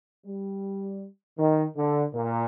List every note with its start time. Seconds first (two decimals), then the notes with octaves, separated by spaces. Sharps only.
0.26 G3
1.39 D#3
1.77 D3
2.14 A#2